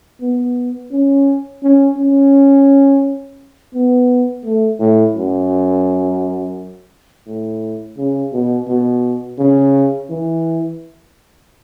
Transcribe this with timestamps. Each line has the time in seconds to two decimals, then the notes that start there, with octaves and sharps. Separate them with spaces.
0.21 B3
0.91 C#4
1.62 C#4
1.97 C#4
3.74 B3
4.45 A3
4.80 A2
5.15 F#2
7.26 A2
7.97 C#3
8.33 B2
8.68 B2
9.38 C#3
10.10 E3